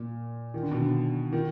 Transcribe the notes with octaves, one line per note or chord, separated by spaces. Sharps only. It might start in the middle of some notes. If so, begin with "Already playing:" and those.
Already playing: A#2
D#3
D3
B2
D3
D#3